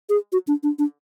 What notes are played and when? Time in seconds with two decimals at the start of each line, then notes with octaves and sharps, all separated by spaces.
0.09 G#4
0.32 F#4
0.47 D4
0.63 D4
0.79 D4